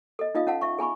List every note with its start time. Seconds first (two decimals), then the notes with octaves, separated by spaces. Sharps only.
0.19 A4 D#5
0.35 D#4 F4 D#5 F5 D#6
0.47 C#4 F5 F#5 A5
0.61 E5 C#6
0.79 G#4 G#5 B5 C#6